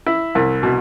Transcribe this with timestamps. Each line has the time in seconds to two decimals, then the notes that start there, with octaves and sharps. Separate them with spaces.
0.06 E4
0.35 C2
0.63 B2